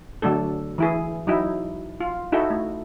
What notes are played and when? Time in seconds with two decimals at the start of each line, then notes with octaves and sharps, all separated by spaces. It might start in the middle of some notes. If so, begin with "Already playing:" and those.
0.22 D3 F#3 A3 D4 A4
0.78 E3 E4 G#4
1.27 F#3 D#4 E4
2.01 F4
2.32 D#4 E4 F#4 A4
2.50 A3